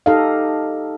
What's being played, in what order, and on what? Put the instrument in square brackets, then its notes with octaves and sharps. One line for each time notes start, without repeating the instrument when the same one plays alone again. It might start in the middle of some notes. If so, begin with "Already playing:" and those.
[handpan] D#4 G4 A4 D#5 F5